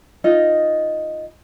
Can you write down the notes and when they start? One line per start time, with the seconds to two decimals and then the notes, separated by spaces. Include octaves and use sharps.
0.24 D#4 F4 D#5